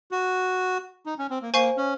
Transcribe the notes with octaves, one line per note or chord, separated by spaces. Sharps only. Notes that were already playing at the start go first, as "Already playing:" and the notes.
F#4
D#4
C#4
C4
A#3
A#3 C5 F5 G#5 C#6
C#4